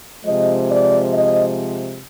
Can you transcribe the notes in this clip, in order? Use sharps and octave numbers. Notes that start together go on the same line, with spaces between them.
C3 F3 G#3 D#5
D5
D#5